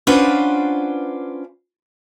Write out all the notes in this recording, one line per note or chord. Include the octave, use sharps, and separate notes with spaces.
C#4 D4 F4 B4 C5 F#5